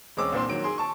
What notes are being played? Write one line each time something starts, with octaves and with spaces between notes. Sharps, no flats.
E1 G#3 C4 C#4 D6 E6
C2 A#2 C4 D4 C6
D#3 F#3 D7
G#4 C6
A5 C#6